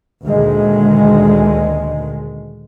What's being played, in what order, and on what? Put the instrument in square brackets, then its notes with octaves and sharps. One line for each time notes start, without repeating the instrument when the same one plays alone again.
[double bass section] D2 A#2 D#3 G#3